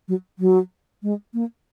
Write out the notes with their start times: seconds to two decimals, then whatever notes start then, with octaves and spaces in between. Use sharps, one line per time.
0.08 F#3
0.39 F#3
1.03 G#3
1.34 A#3